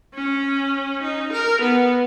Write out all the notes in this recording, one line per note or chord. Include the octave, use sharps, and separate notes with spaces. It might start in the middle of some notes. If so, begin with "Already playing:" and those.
C#4
D#4
A#4
B3